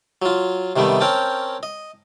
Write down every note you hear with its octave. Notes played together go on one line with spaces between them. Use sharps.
F#3 F4
C3 D#3 G3 A3 B3
C4 C#4 A#4 G5 A5
D#5